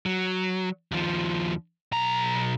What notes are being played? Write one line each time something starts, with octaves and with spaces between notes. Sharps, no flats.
F#3
D#2 F3
B1 A#5